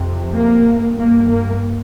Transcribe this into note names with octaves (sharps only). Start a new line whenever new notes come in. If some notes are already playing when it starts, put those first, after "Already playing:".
Already playing: F2 C3
A#3
G2
A#3
A#3